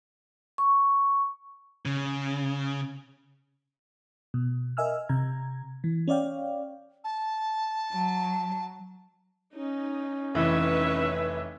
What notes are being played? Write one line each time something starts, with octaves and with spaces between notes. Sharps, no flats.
C#6
C#3
B2
A#4 D#5 E5 G#5 E6 F6
C3 A#5 G#6
E3
C#4 C#5 D5 F5 G5
A5
F#3
C#4 D#4
F1 E3 D#4 B4 C#5 E5